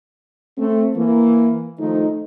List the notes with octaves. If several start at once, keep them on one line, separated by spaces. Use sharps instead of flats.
A3 C4
E3 A#3
D#3 F3 A3 D#4